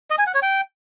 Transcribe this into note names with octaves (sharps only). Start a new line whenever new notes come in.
D#5
G#5
F#5
C#5
G5